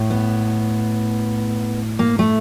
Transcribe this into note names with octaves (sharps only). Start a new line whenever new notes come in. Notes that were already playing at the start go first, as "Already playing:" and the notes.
Already playing: A2
B3
A#3
A3